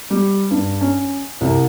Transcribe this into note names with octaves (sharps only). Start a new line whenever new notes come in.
G3
G2
C#4
C2